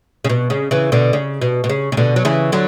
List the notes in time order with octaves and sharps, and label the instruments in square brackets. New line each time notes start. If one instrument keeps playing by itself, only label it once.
[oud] C#3
B2
C#3
C#3 E3
B2 D3
C#3
B2
B2
C#3
C#3
B2 D3
F#3
C#3 E3
D3 F#3